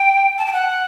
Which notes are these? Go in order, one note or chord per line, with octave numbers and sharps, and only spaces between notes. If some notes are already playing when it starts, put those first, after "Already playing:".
Already playing: G5
A5
G5
F#5